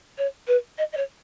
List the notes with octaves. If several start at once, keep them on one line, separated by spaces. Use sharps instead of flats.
C#5
B4
D#5
D#5
C#5